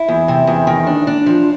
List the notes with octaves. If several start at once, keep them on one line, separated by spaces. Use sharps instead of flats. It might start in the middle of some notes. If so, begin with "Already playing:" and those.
Already playing: E4
E2
C3
E2
D#3
D4
D4
F3